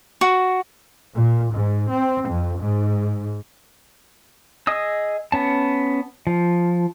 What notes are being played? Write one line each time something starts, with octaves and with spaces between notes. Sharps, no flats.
F#4
A#2
G#2
C4
F2
G#2
G#4 D#5 D#6 E6
B3 C#4 A5
F3